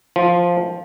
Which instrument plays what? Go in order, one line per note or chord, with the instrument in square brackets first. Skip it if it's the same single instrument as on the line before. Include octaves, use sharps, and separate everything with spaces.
[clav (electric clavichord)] F3